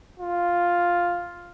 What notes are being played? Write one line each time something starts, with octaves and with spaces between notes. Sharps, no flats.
F4